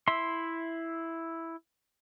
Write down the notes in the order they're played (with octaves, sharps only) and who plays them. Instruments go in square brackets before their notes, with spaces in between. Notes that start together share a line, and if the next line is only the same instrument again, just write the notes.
[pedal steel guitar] E4 E5 C6